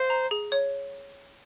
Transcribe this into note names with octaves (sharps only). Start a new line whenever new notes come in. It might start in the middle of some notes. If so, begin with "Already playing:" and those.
Already playing: C5 F5
A#5
G#4
C#5